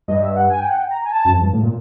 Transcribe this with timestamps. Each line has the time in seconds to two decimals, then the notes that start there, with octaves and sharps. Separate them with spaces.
0.08 G2 D#5
0.22 E5
0.36 F#5
0.50 G#5
0.58 G5
0.67 F#5
0.77 G5
0.91 A#5
1.05 G#5
1.12 A5
1.25 F#2
1.32 F2
1.42 G2
1.53 A2
1.63 A#2